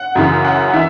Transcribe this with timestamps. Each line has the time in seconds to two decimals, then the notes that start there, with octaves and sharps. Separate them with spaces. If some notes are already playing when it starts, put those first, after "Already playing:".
Already playing: F#5
0.16 F#2 C#3 E3
0.45 F#5
0.73 E3 E5